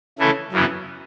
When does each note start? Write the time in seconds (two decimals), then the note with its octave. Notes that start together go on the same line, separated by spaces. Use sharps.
0.19 C#3 E3 A3 E4 A4
0.52 F#2 C#3 E3 B3